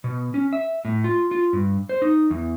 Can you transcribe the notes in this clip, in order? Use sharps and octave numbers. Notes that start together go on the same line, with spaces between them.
B2
C#4
E5
A2
F4
F4
G2
C5
D#4
E2